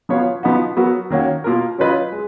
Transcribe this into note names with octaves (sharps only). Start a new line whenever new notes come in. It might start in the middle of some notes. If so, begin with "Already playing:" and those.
F3 B3 F#4 C#5 F5
F3 B3 D#4 F#4
F#3 B3 F#4 A#4
D#3 A#3 C#4 F#4
B2 A#3 F4 A#4
F#3 C#4 F4 B4 D#5
G#3